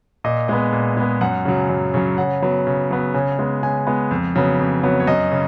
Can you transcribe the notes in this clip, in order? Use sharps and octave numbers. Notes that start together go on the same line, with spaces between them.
A#2 D#5
G#3 B3 D#5
A#2
G#3 B3
F#2 F#5
C#3 F#3
F#2
C#3 F#3
C#3 F#5
F#3 B3
C#3
F#3 B3
C#3 G#5
G#3 B3
C#3 G#5
G#3 B3
F2
C#3 F#3 B3
F2
C#3 F#3 B3
C#5
F#2 D#5
C#3